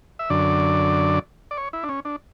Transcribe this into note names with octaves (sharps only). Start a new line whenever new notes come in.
E5
F#2 D3 D5
D5
C#5
E4
D4
C#4
D4